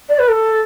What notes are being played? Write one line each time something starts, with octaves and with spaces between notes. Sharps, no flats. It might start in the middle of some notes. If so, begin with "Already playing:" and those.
D5
B4
A4